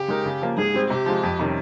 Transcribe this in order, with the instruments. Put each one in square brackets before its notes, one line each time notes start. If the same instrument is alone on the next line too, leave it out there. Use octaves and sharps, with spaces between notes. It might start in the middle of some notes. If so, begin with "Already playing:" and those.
Already playing: [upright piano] C#3 [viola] G4
[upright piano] G#3 D#4 A#4
C#3
F3 A#3 F4
[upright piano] G#2 [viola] G#4
[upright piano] G3 C4
[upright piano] C3 [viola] G4
[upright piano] F3 G#3
F2
C3 D#3 G3 C#4